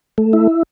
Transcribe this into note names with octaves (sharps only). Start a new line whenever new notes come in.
A3
E4